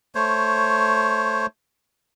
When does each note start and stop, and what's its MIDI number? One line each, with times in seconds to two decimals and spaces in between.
0.15 1.46 57
0.15 1.46 72
0.15 1.46 73